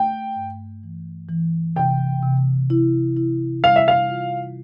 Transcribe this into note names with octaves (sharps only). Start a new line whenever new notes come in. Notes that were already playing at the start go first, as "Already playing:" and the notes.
Already playing: A3 G5
G2
E3
E3
C3 G5
C3
E4
E4
G3 F5
E5
F5
F4